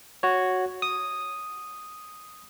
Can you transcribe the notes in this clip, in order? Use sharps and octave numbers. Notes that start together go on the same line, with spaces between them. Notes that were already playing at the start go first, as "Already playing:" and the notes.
F#4 C#5
D#6